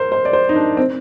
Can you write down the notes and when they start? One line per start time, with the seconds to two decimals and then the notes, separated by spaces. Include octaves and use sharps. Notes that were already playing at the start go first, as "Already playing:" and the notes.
Already playing: A#4 C5
0.12 C5
0.25 D5
0.33 C5
0.49 D#4
0.55 D4
0.77 C4